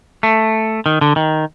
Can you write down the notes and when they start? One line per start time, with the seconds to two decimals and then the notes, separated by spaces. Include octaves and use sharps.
0.23 A3
0.86 D#3
1.01 D3
1.16 D#3